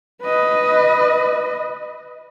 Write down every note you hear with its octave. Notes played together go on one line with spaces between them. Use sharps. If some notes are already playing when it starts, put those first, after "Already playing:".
B4 D#5